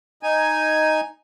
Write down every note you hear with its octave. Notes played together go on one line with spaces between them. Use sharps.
D#4 G#5